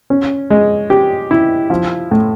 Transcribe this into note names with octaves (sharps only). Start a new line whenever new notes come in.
C#4
G#3
G4
E4
F3
A2